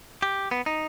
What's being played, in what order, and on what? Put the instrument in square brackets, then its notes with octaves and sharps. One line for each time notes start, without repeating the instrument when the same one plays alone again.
[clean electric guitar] G4
B3
D#4